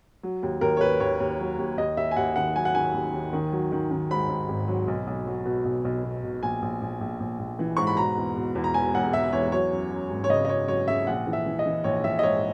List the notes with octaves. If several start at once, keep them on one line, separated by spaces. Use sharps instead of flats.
F#3
D#2
D#2 A#4
C#5
D#2 B4
D#2 C#5
D#2
F#3
D#2
D#2 D#5
D#2 E5
G#5
D#2 F#5
D#3 F#5
F#3 G#5
F#5
D#3 G#5
D#2
D#2
D#3
F#3
D#3
D#3
G#2 B5
G#2
G#1
F#3
B1
B1
F#3
B2
B1
B1
B2
B2
A#1 G#5
A#1
A#1
A#1
A#1
A#1
E3
G#2 C#6
B5
B2 A#5
E2
B2
E2
A#5
E1 G#5
E1 F#5
E1 E5
E2 C#5
F#3 C#5
F#2
F#2
G#1
C#5
C#3 D#5
D#5
F#2 C#5
F#3 C#5
C#3 E5
A#1 F#5
E3
E5
E3
D#5
E3
A#1 C#5
A#1 E5
D#5
G#2 C#5